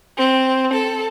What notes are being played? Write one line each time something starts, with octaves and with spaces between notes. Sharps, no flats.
C4
A4